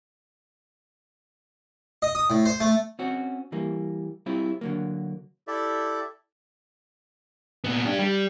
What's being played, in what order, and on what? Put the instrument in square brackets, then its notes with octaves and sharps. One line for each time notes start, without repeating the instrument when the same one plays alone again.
[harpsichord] D#5
D#6
A2
C5
A3
[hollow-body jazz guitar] C4 C#4 F#4
E3 G3 A#3
G3 C4 E4 F4
D3 F#3 A#3
[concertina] E4 G4 A4 D5 E5
[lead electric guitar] A#2 B3
D4 G4
G3